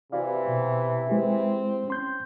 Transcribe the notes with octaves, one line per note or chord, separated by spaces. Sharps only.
C3 E3 F#4 D5 F5
B2
G#3 C4 E4 G4
C#4 C6 G6